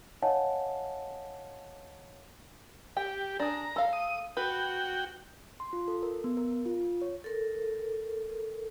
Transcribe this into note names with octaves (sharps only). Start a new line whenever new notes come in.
C#5 D#5 F5 F#5 G#5 A5
G4 G5
D4 G#4 A#5
A4 F5
D#6
F#4 B4 G5
C6
F4
A4
A#4
B3
A#4
F4
C#5
A4 A#4